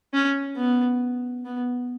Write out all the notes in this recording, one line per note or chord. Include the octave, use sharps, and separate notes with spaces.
C#4
B3
B3